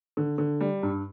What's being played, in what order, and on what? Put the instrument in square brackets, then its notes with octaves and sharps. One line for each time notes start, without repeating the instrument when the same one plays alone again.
[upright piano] D3
D3
G3
G2